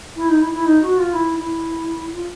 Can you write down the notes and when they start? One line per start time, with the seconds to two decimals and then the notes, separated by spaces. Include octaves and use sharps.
0.16 E4
0.29 D#4
0.41 E4
0.53 E4
0.65 D#4
0.82 F#4
0.98 F4
1.13 E4
1.38 E4
2.12 F4